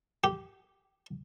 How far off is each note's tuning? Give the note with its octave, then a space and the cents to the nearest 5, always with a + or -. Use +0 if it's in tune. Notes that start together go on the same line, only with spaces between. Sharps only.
G4 -10